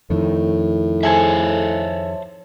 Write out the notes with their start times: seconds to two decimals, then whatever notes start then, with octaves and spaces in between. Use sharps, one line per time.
0.10 F2 A2 D#3
1.03 G#4 A4 C5 C#5 E5 G#5